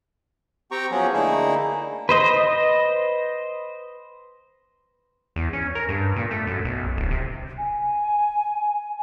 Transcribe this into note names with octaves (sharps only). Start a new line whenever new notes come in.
C4 G4 G5 A#5 C#6
F3 F#3 B3 C#4 G#4
D3 A3 A#3 D#4 E4 G#4
B4 C5 D#5
E2
C#4
A#4
G2
A#2
A3
F#2
B1
D1
C3
G#5